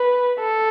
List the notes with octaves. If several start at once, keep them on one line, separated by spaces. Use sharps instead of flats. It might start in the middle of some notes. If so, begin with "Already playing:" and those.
Already playing: B4
A4